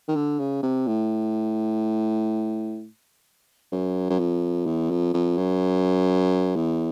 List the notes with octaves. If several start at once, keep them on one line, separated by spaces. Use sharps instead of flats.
D#3
D3
C#3
C3
A2
F#2
F#2
F2
E2
F2
F2
F#2
E2